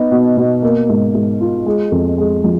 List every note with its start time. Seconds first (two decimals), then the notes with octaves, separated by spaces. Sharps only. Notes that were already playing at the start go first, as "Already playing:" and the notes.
Already playing: B3 D#4
0.11 B2
0.37 B2
0.62 A#3
0.89 G#2
1.14 G#2
1.41 F4
1.66 G#3
1.92 F2
2.18 G#3
2.44 F3